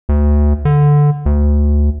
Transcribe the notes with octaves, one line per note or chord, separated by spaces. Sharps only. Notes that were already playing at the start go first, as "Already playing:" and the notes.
D2
D3
D2